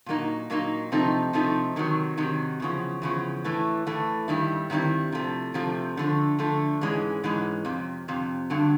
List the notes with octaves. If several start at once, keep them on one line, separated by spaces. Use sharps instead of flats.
A#2 F#3 A#3 D#4
A#2 F#3 A#3 D#4
C3 F3 A3 C4 D#4
C3 F3 A3 C4 D#4
C3 D#3 F#3
C3 D#3 F#3
E2 C#3 F3
E2 C#3 F3
A2 E3 A3
A2 E3 A3
G2 D#3 G3 E4
G2 D#3 G3 C4 E4
C3 F3 A3
C3 F3 A3
D3 F3 A3
D3 F3 A3
G#2 E3 G#3 C#4
G#2 E3 G#3 C#4
F2 C3
F2 C3
G2 D3 F#3